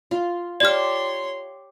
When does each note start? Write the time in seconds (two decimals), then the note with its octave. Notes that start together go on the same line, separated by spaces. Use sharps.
0.11 F4
0.60 G4 C#5 D5 A5 C6 F6